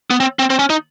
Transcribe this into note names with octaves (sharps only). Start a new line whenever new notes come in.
B3
C4
C4
C4
C#4
D#4